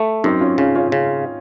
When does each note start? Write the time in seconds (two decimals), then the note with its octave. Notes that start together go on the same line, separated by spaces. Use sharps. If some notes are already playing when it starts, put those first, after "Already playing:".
Already playing: A3
0.24 F#2 C4 D#4
0.40 C#4 F4
0.58 C#3 C#4 F4
0.75 C#4 F4
0.92 C#3